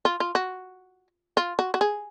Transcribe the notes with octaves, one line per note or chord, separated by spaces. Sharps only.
F4
F4
F#4
F4
F#4
F#4
G#4